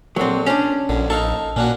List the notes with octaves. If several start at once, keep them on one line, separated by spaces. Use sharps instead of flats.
A#1 D3 F#3 C4
C#4 D4 C5 D5
A#1 D3
D#4 A4 F5 C#6
A#2 C#4 D4 F#4